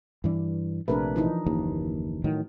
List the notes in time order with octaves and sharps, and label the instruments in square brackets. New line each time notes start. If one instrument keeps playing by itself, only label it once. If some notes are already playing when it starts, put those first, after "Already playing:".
[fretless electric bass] G2 E3 D4
[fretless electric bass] A#1 C3 A3 [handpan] D4 A#4 B4
[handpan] E3 F3 D#4
[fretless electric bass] F#1 D#2
A2 D#3 F#3